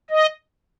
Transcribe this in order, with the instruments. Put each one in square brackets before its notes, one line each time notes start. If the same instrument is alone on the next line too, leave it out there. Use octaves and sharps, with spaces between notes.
[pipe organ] D#5